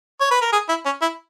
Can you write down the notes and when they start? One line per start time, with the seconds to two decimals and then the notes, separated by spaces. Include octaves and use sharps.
0.20 C#5
0.31 B4
0.42 A#4
0.53 G#4
0.69 E4
0.85 C#4
1.02 E4